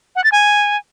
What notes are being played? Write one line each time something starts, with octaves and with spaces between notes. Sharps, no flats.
F#5
A6
G#5